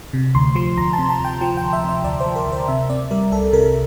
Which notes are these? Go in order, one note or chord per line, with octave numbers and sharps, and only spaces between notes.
C3
D2 C6
F3 C6
D2 A#5
A5
C3
A5
D2 G5
F3 G5
D2 G5
E5
C3
E5
D2 D5
C5
F3
A#4
D2
C5
C3 E5
C4 D5
G3 A#4
C2 A4
C3 A#4